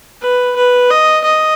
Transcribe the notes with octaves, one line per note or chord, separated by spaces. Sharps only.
B4
B4
D#5
D#5